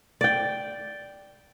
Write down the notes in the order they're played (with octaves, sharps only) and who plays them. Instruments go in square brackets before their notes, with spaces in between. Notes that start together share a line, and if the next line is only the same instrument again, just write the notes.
[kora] D5 G5